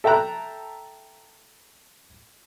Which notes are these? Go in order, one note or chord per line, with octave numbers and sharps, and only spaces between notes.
A4 E5 G5 A5 A#5 F#6